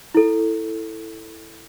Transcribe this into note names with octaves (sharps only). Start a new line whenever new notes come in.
E4 A4